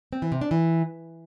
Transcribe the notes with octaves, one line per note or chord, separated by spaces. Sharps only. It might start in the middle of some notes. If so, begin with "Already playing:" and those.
C4
E3
C3
D4
E3